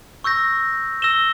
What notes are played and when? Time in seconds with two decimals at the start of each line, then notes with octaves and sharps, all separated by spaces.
0.24 C#6 E6 G6 A#6
1.02 E6 A#6 E7 G7